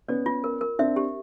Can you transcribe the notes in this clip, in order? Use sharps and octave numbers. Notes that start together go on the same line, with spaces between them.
B3 C#4 D5
F4
A#4
A#4
C4 D4 E5
G4